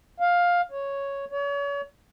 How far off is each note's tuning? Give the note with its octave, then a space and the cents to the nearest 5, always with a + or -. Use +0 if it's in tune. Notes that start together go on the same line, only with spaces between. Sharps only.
F5 +10
C#5 +0
C#5 +35